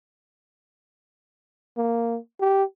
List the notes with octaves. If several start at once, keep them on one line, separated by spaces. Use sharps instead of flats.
A#3
G4